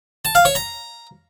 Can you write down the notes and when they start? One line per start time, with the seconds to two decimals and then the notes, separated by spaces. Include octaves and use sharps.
0.25 A5
0.35 F5
0.45 C#5
0.55 A#5